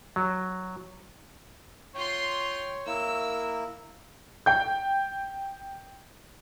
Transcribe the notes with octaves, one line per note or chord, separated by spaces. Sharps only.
F#3
F4 C#5 G5 C6
A#3 E4 A#4 E6
G5 G6